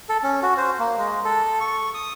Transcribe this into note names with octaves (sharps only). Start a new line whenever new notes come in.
A4
C#4
F#4
C5
A#3
G#3
A4
C#6
D#6